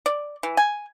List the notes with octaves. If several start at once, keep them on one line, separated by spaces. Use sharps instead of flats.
D5
E3
G#5